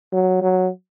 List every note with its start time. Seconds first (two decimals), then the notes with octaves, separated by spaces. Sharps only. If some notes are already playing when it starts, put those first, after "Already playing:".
0.13 F#3
0.42 F#3